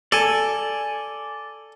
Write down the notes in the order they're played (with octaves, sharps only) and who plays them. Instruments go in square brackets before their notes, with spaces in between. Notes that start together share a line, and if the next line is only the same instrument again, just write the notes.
[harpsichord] A4 [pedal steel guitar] D5 G#5